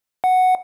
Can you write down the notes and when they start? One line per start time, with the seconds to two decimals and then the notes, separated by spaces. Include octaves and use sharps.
0.24 F#5